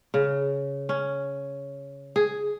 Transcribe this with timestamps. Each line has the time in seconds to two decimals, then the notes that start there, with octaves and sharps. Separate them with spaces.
0.14 C#3
0.89 C#4
2.16 G#4